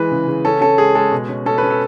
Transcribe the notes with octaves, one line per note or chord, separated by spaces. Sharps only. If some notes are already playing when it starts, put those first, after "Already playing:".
Already playing: E3 G#3 B4
C#3
C#3
C#4 A4
C#4 A4
G#3 G#4
G#3 A4
B2
C#4
C#4 A4
C#4 B4
A4